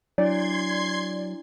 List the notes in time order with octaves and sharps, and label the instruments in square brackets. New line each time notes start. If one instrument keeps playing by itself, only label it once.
[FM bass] F#3 [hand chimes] D4 E4 [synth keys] D5 [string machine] C6 G#6 C7